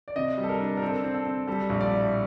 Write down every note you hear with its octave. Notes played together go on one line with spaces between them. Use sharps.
D5
C3 D#5
G3
A4
A#4
D4
A#4
C4 A4
C4
A4
C4
G3 A4
A#1
D5
A2